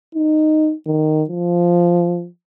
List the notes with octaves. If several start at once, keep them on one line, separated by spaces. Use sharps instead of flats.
D#4
D#3
F3